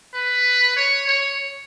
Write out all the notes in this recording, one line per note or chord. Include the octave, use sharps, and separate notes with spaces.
B4
C#5
C#5